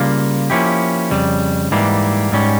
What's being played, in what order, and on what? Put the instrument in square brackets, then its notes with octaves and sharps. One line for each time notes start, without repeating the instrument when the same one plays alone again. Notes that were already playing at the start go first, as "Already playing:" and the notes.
Already playing: [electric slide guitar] C#3 G3 A#3 F4
F3 A#3 C#4 E4 G4
F2 C#3 G3
G#2 E3 G3 A#3
G#2 G3 C#4